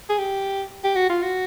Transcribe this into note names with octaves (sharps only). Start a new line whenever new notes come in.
G#4
G4
G4
F#4
F4
F#4